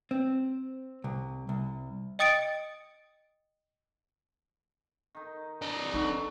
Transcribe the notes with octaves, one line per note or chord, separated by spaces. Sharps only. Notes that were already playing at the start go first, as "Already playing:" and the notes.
C4
C2
C2
D#5 G5 D#6 A6 C#7 D7
D#3 D#4
D4 D#5
D#4 F#4 A4 B4